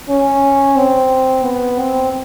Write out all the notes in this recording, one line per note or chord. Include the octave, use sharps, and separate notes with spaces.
C#4
C4
B3
C4